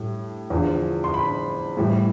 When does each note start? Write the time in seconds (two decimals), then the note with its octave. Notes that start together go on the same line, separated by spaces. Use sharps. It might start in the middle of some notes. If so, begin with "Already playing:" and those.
Already playing: A2 G3
0.50 E2 D3 F3
1.04 C6
1.14 B5
1.77 A2 E3 G3